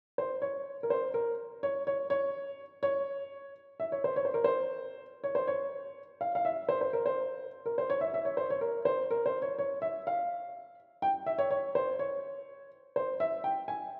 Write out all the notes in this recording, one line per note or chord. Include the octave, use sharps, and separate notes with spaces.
C5
C#5
A#4
C5
A#4
C#5
C#5
C#5
C#5
E5
C#5
C5
C#5
C5
A#4
C5
C#5
C5
C#5
F5
F5
E5
C5
C5
A#4
C5
A#4
C5
C#5
E5
E5
C#5
C5
C#5
A#4
C5
A#4
C5
C#5
C#5
E5
F5
G5
E5
C#5
C#5
C5
C#5
C5
E5
G5
G#5